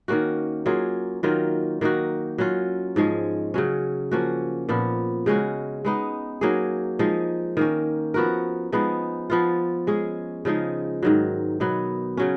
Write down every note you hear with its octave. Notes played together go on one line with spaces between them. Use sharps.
D#3 A#3 C#4 F#4
F#3 A#3 F4 G#4
D#3 F#3 A#3 F4
D#3 A#3 D#4 F#4
F#3 C#4 F4
G#2 F3 G#3 C#4
C#3 F#3 C#4
F3 A#3 C#4 F#4
A#2 F3 B3
C#3 G#3 C#4 F#4
G#3 B3 D#4
F#3 A#3 D#4 G#4
F3 G#3 D#4
D#3 A#3 C#4
F3 B3 F#4 A#4
F3 G#3 B3 D#4
F3 B3 F4
G#3 C#4 G#4
C#3 F3 G#3 D#4
G#2 D#3 F#3
B2 F#3 B3 D#4
C#3 F#3 C#4